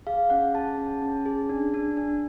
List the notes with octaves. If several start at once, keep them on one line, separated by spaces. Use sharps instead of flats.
G#4 F5
C#4 F#5
G#4 A5
C#4
C#4
G#4
D4
D4
D4